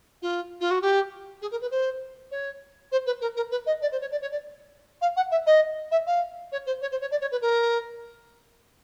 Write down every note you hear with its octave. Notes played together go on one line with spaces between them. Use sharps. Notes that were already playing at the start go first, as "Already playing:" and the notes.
F4
F4
F#4
G4
G#4
A#4
B4
C5
C#5
C5
B4
A#4
A#4
B4
D#5
D5
C5
C#5
D5
C#5
D5
F5
F#5
E5
D#5
E5
F5
C#5
C5
C#5
C5
C#5
D5
C#5
B4
A#4